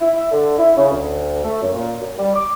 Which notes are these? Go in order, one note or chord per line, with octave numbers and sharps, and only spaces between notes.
E4
E5
D3
E4
C#3
D2
A3
F#2
A#2
F#2
G3
D6